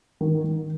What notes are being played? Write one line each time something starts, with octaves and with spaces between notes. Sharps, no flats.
D#3
D#3